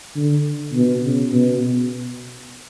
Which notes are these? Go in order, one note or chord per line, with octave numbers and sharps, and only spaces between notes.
D3
B2
C#3
B2